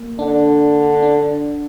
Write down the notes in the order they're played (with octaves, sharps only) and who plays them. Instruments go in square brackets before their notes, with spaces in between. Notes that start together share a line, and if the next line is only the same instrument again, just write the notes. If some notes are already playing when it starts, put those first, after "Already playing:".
Already playing: [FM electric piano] A#3
[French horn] D3 [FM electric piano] D4
[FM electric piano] D4